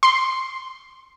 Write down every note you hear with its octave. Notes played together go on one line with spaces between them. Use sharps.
C6 C7